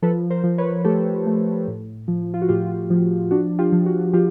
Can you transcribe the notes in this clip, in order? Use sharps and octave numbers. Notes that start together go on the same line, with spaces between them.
F3 A4 B4
A#4 C5
F3
B4 C#5
A3 G4 A4
A3
A2
F3
F4
F#4
A2 F4 G4
F3
D4 F#4
F4 G4
F3
F#4
F3 F4 G4